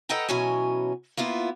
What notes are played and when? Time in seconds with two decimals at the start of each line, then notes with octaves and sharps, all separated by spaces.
0.09 A4 B4 D#5 F#5 G5 A#5
0.29 B2 E3 F#3 C#4 G#5
1.17 A#3 B3 E4 F4